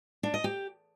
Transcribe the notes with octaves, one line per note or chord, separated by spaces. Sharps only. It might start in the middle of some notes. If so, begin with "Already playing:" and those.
D4
D#5
G4